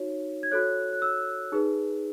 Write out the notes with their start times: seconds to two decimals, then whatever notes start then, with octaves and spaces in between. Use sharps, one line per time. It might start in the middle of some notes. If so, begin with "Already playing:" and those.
Already playing: D#4 F#4 C#5
0.43 G#6
0.51 F#4 A4 C#5 F#6
0.93 F#6
1.02 E6
1.52 D#4 G#4 B4